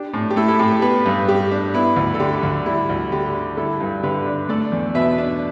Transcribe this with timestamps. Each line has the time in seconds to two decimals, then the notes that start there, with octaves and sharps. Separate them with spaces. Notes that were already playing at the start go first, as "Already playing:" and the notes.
Already playing: D4 G4
0.14 A2
0.30 G4
0.36 A3 E4 A4
0.48 E4 A4
0.59 A2 G4
0.71 G4
0.82 B3 G4 B4
1.06 G2
1.28 G3 G4
1.51 D4
1.74 B3 E4
1.96 D2
2.14 A4
2.20 D3 G4
2.43 D2
2.66 G3 E4
2.89 D2
3.12 D3 G4
3.35 D4
3.57 G3 E4 A4
3.80 G2
4.03 D3 G4 B4
4.27 D4
4.49 A3 A4 D5
4.72 E2
4.95 B2 B4 E5
5.18 D4